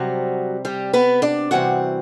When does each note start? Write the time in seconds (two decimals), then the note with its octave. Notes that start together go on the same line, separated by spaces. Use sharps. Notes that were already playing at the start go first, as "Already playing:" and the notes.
Already playing: C3 F#3 G3 C4 F#4
0.65 G3 G4
0.93 B3 B4
1.22 D4 D5
1.51 C3 E3 G3 C4 F#4 F#5